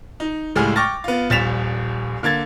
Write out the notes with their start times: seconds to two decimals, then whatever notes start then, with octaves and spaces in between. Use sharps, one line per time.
0.20 D#4
0.55 C#2 A2 G3 G#3 G#4 F6
0.76 G5 C#6 D6 F6 A6 A#6
1.04 B3 F4
1.30 D#1 A#1 A6 B6 E7 F7
2.23 D3 A#3 G#6 A6